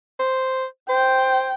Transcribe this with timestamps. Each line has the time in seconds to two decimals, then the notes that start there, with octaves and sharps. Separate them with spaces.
0.19 C5
0.90 C5 G5